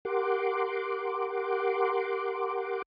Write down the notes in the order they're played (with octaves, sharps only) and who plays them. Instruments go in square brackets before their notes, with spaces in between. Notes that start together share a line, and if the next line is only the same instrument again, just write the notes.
[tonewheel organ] G4 A#4 F#5 C6 D6